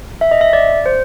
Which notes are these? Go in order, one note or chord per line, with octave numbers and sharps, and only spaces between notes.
E5
D#5
E5
D5
C5